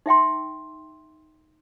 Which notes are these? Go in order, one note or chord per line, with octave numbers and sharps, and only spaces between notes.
D#4 E5 G5 C6